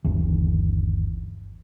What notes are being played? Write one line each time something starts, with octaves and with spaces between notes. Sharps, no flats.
G1 D#2 E3